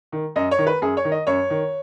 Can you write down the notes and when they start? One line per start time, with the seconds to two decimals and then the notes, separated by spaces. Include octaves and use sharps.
0.12 D#3
0.36 F#2 D#5
0.51 C#5
0.58 D#3
0.67 B4
0.82 F#2 G#4
0.97 C#5
1.05 D#3
1.12 D#5
1.27 F#2 C#5
1.50 D#3